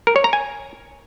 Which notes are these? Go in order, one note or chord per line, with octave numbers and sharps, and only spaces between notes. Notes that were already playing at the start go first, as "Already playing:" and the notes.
A#4
C#5
A#5
G#5